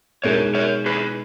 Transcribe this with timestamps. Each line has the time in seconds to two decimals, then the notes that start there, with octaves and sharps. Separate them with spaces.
0.24 B2 G#3 D#4 A#4 C#5
0.55 A#4 C#5
0.86 G#4 B4